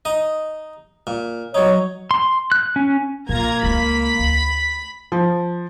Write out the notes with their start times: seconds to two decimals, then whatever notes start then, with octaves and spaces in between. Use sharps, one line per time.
0.05 D#4 D#5
1.07 A#2
1.54 F#3 D#4 C#5
2.11 C6
2.52 F#6
2.76 C#4
3.29 A#1 A#3 F4 A#5 G#6
3.63 C#2 A3 B5 B6
4.19 D2
5.12 F3